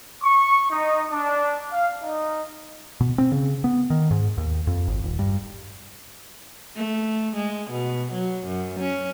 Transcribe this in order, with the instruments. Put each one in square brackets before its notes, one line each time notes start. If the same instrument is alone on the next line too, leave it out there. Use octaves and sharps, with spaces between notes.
[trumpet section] C#6
D#4
D4
F5
D#4
[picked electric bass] B2
C4
C#3
B3
D#3
G#2
D#2
F2
G#1
D#1
G2
[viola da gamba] A3
G#3
B2
F#3
F#2
C#4